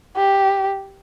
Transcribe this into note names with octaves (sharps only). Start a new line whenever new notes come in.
G4